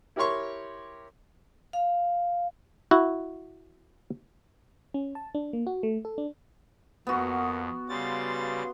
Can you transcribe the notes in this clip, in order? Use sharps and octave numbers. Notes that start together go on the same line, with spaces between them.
E4 G4 A#4 C#5 C6 C#6
F5
E4 F#4
C#4
A5
D4
A#3
F#4
A3
A4
D4
F2 B3 F#4 A#4 F#5
C#3 G3 F5 C6 A6